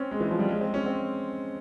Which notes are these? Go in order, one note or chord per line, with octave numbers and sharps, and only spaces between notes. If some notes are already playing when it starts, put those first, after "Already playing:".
Already playing: C4 C#4
G#3
E3
F3
G3
G#3
C4
C#4
C4